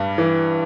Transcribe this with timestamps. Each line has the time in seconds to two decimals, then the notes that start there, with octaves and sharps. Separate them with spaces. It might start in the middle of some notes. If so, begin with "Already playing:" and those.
Already playing: G2 G3
0.18 E3